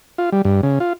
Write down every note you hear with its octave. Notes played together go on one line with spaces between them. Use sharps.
F4
G3
G2
C#3
F4